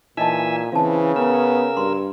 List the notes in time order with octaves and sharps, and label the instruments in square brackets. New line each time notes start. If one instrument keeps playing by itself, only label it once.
[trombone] A#2 [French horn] E3 [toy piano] D#4 D#5 A5 [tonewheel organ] E5 G#5 E6
[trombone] C#3 [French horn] E3 [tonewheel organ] C4 [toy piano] F5 A5
[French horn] B3 [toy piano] C#4 [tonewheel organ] A#4 E6
[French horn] G2 [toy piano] C6